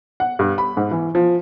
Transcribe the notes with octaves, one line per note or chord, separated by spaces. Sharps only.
F#5
G2
B5
G#2
E3
F3